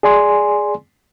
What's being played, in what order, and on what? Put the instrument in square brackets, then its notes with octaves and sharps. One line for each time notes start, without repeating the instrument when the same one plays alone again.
[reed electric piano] G#4 D5 G#5 C6